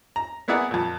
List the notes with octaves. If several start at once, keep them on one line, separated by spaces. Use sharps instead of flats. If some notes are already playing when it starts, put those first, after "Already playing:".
A#5
A#3 B3 E4 G#4 D5 F#5
F2 A#2